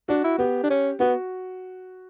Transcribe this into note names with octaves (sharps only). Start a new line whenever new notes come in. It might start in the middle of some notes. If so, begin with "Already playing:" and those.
D4 F#4
E4
B3 G4
D4
C#4
B3 F#4